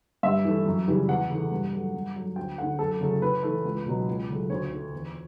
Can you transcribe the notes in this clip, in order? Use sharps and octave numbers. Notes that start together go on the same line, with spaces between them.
G2 E5
E3 A3
F#2
C#3 E3 G3
E2 F#5
C#3 E3 A3
G2
F#3 A3
G2
F#3 A3
D2 G5
D3 A3 F#5
F#2 A4
C#3 F#3 A3
A2 B4
E3 A3
C#2
B2 F#3
C#2
C#3 F#3 A3
D2 C#5
D3 A3
E2